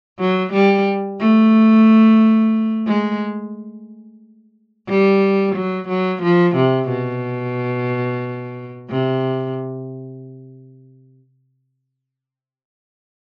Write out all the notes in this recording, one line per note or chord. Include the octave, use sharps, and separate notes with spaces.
F#3
G3
A3
G#3
G3
F#3
F#3
F3
C3
B2
C3